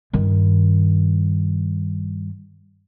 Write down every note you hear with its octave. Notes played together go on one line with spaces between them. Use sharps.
G2 D#3